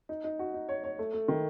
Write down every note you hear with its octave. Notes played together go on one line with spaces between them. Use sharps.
D#4
D#4
F#4
D#4
C#5
C#5
A3
A3
D#3